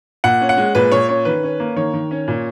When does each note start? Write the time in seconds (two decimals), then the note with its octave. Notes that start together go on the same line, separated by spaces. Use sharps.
0.24 A#2 F#5
0.41 C#4
0.49 F#5
0.57 G#3
0.75 A#2 B4
0.92 A#2 C#5
1.09 C#4 C#5
1.25 D#3 B4
1.43 C#4
1.60 A#3
1.76 D#3 C#5
1.94 D#3
2.11 C#4
2.28 A#2